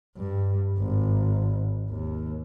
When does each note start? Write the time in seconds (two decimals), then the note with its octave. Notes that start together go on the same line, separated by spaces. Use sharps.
0.17 G2
0.79 G#1
1.89 D#2